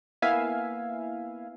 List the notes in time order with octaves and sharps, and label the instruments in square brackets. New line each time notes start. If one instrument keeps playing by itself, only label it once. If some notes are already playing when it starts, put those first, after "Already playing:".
[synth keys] A#3 B3 E4 E5 F5 G#5